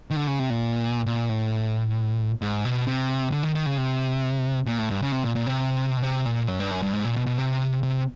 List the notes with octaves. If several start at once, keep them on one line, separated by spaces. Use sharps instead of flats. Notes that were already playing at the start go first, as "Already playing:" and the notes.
D#3
D3
C#3
C3
A#2
A#2
A2
G#2
B2
C3
D3
D#3
D#3
C#3
C3
A#2
A2
G2
C#3
C3
A#2
A#2
C3
B2
C3
A#2
F#2
G2
F#2
G2
G#2
A#2
B2
B2
C3
C3